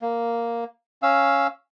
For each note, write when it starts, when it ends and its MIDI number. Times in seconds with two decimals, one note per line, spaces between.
0.02 0.64 58
1.02 1.47 61
1.02 1.47 77
1.02 1.47 88